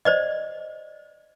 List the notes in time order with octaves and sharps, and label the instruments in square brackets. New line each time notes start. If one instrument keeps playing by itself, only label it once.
[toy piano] C5 D5 D#5